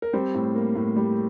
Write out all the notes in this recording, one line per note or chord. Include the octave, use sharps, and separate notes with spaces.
A#4
G3 C4 C5
A2
A#3
A2
G3